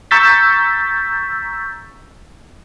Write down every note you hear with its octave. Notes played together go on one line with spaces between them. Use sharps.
A#5 C#6 E6 G6 A6 B6